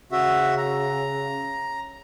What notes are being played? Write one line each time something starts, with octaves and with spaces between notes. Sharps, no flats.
C#3 F#4 E5
A#5